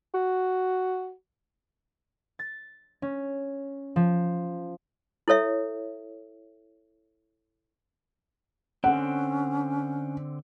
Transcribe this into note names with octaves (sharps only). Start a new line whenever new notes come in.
F#4
A6
C#4
F3
E4 A4 C#5 E5
D3 C4 C#4 F#5